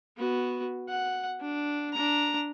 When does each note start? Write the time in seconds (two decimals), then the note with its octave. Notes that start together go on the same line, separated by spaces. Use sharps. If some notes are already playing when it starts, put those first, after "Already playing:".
0.18 B3 F#4
0.89 F#5
1.41 D4
1.93 D4 A#5